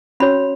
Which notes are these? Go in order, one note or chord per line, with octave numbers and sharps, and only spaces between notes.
C#4 F#4 C#5 B5